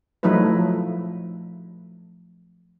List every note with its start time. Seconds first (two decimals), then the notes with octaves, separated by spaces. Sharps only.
0.23 F3 F#3 A3 D#4 E4 B4